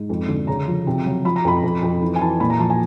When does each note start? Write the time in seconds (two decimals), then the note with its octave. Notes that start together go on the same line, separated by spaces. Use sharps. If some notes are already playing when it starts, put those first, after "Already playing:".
Already playing: G#2
0.09 F2
0.28 D3
0.47 C#3 A#5
0.67 F3
0.87 C3
1.06 F#3
1.25 F3 B5
1.36 A#5
1.45 F2 B5
1.64 F2
1.82 F2
2.02 E3
2.16 G#5
2.21 E3 A5
2.40 A#2 B5
2.50 A#5
2.59 F3 A5
2.70 G#5